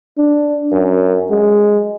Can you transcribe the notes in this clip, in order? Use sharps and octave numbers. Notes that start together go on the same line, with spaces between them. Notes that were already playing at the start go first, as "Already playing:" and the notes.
D4
F#2
G#3